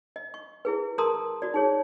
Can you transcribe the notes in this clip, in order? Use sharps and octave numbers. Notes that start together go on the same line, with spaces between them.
D#5
C#6
E4 G#4 B4
G#4 A#4 A5 A#5 C6 D#6
F#4 D5
D#4 G#4 C#5